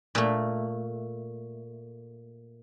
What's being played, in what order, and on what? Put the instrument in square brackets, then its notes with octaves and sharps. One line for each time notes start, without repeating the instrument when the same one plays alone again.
[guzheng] A#2 A3